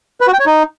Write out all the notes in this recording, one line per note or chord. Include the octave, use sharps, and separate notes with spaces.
B4
F#4
G5
C#5
D#4